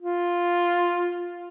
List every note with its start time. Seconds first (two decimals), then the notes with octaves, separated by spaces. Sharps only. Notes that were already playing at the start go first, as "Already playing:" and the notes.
0.01 F4